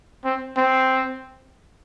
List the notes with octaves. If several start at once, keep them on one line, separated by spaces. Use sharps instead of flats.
C4
C4